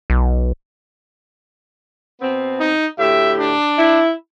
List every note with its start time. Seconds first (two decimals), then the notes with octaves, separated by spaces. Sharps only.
0.10 B1
2.22 B2 B3 C4
2.60 D#4
2.99 D2 A2 G4 E5
3.39 D4
3.78 E4